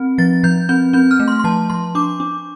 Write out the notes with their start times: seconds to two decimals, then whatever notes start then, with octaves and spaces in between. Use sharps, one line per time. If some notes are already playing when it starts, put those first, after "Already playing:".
Already playing: C4
0.18 F3 A6
0.43 F3 G6
0.69 C4 G6
0.93 C4 G6
1.11 F6
1.20 A3
1.28 C6
1.39 C6
1.44 F3 A5
1.70 F3 C6
1.95 D4 D6
2.20 D4